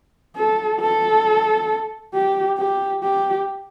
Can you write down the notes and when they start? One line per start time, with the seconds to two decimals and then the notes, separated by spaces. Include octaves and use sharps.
0.36 A4
0.80 A4
2.14 G4
2.58 G4
3.03 G4